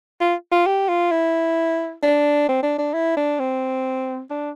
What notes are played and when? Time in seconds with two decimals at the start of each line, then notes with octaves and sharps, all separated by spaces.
0.21 F4
0.51 F4
0.66 G4
0.89 F4
1.12 E4
2.03 D4
2.49 C4
2.63 D4
2.78 D4
2.94 E4
3.16 D4
3.39 C4
4.30 D4